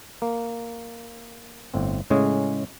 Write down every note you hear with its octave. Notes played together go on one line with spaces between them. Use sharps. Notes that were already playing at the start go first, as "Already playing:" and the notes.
A#3
G1 A2 C4
A2 C#3 G#3 C#4 G#4